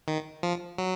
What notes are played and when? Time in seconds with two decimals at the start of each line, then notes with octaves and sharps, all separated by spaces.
0.08 D#3
0.43 F3
0.78 F#3